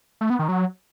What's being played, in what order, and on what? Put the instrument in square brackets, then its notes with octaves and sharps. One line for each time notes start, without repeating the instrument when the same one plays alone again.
[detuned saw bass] A3
B3
D#3
F#3